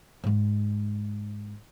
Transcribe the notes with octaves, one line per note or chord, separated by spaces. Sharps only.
G#2 G#3